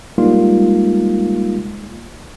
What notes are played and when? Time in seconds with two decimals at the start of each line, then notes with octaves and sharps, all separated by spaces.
0.18 G3 G#3 A#3 D#4 F4